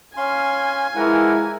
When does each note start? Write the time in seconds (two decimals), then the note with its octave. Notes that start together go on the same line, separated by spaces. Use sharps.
0.17 C#4 F5 G#5 C6
0.96 E3 F3 G#3 E4 A#4 F#5